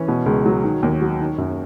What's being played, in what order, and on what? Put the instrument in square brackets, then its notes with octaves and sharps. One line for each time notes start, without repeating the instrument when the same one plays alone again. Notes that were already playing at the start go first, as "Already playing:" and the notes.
Already playing: [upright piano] E3 C#4
B2
C#2
F#3
D#3
D#2
F#3
D#3
F#2